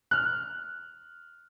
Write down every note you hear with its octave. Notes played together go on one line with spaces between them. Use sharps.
F6 F#6